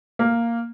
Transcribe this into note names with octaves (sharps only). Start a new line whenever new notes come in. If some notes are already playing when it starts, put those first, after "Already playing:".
A#3